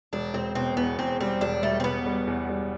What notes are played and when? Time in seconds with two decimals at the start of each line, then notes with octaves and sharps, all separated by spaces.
0.13 E1 D4
0.34 E1 C4
0.55 B2 C4
0.77 E2 B3
0.98 E2 C4
1.20 G3 C4
1.41 E1 D4
1.62 G3 A3
1.80 C4
1.84 B2 B3
2.06 G3
2.27 E2
2.49 G3